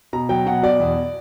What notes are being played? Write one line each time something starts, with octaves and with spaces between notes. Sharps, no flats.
B2 A#5
F#3 G5
B2 F#5
B2 D5
E2